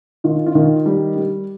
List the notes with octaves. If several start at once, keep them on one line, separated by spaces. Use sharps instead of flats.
D#3 F4
F4
D#3
G3
G3